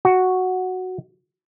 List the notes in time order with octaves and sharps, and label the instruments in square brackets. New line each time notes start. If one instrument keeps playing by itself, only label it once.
[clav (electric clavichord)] F#4